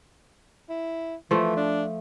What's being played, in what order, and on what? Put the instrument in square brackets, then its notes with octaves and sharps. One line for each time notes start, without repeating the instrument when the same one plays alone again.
[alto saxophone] E4
[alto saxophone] E3 [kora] F3 A3
[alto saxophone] D4